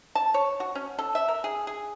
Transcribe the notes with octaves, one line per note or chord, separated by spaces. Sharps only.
A5
C#5
F#4
C#4
A4
E5
A#4
G#4
G#4